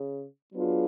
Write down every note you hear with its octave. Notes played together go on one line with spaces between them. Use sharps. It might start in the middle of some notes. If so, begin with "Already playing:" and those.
Already playing: C#3
F#3 B3 D4 F4 G#4